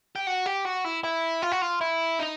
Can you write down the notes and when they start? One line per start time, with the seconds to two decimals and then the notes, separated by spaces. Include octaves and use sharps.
0.16 G4
0.27 F#4
0.46 G4
0.65 F#4
0.84 E4
1.04 E4
1.42 F4
1.52 F#4
1.61 F4
1.81 E4
2.19 D#4